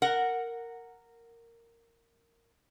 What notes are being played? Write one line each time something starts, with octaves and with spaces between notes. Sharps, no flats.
A#4 F#5